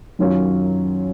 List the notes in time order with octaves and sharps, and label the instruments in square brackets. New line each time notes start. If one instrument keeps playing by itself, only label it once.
[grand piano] F#2 D#3 F#3 C#4 F4